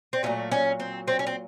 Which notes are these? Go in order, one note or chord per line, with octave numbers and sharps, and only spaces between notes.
C4
A#2 F#3 A3 C#4
C#4
C4
C4
C#4
C4